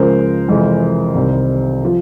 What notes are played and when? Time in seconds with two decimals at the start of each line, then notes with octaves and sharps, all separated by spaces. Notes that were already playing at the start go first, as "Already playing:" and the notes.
Already playing: C#2 C#3 F3 G#3 A#4 C5
0.48 F2 C3 E3 G#3
1.15 C2 C3 D#3 G3
1.85 F3